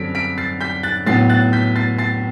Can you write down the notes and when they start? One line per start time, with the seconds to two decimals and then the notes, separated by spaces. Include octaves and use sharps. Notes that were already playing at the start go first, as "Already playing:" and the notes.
Already playing: F#2 D3 G3 C4 B6 D7
0.15 B6 D7
0.38 A6 C7
0.61 G6 B6
0.83 F#6 A6
1.06 A2 F#3 B3 A6 C7
1.29 F#6 A6
1.53 G6 B6
1.76 A6 C7
1.98 A6 C7